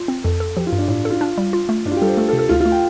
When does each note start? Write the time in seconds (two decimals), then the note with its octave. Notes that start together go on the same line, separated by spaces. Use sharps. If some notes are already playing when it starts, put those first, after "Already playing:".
Already playing: F4
0.08 C4
0.24 F2 A4
0.40 A4
0.56 F3 G4
0.67 F4
0.72 G2
0.78 D4
0.88 A2
1.05 A4
1.10 F4
1.21 D4
1.38 G3
1.53 F4
1.69 A3
1.86 G2 D4
1.91 F4
1.96 G4
2.02 G3 A4
2.07 C5
2.17 A3 A4
2.28 A4
2.33 C3
2.38 A4
2.49 D2 F4
2.60 F4
2.65 A3
2.72 G5